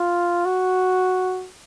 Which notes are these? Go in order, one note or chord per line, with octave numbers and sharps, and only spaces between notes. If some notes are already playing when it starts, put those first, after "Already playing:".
Already playing: F4
F#4